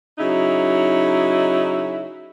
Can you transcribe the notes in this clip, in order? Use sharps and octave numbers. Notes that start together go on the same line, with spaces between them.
C#3 F#3 D#4 E4